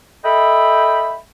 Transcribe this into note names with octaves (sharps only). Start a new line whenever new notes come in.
A4 D#5 E5 G5 B5